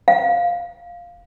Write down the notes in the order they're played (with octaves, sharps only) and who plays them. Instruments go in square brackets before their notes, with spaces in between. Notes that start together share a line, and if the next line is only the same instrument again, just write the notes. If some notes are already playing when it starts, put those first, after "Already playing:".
[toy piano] F5